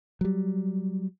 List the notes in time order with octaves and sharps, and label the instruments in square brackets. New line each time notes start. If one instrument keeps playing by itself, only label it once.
[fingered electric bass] F#3 G3